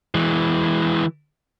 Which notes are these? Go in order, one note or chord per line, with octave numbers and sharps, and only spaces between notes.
E3 G#3